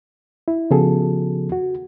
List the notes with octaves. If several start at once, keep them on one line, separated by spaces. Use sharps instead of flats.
E4
C#3 F3 B3 F#4 G#4 A4
F#4